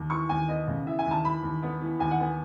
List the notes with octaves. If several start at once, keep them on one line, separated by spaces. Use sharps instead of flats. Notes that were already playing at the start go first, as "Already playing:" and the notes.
Already playing: D#2
E3 C#6
D#2 G#5
B3 D#5
C#3
E3 E5
G#5
D#2
A5
E3 B5
D#2
B3
E3
D#2 G#5
F#5
B3 G#5